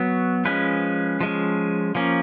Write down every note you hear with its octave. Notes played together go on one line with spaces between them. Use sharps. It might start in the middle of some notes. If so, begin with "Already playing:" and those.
Already playing: F#3 B3 F#4
F3 G#3 C#4 B4
F3 G#3 C#4
F3 A#3 C#4